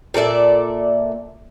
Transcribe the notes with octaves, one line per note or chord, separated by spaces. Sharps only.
A#2 A4 D5 E5